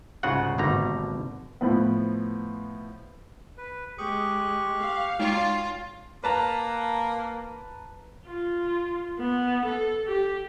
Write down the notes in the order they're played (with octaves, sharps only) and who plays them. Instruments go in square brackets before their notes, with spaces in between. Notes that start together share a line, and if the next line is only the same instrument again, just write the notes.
[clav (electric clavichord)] C2 G#2 C#3 F4 F#4 F#5
G#1 B2 D3 G3 A3 A#5
[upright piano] A2 F3 B3
[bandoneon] B4
[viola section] G#3 [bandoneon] G4 C#6 F#6 [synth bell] D#6
[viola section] F5
[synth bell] G#3 D#4 [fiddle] F4
[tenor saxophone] A#3 [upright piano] B4 A5 A#5
[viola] F4
B3
A4
G4